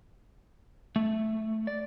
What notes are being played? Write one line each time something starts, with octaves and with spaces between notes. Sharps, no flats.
A3
D5